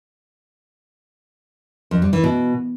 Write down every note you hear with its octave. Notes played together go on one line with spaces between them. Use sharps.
F2
G3
E3
B2